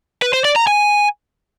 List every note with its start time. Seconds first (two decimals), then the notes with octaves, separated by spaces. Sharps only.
0.22 B4
0.33 C5
0.45 D5
0.56 A#5
0.67 G#5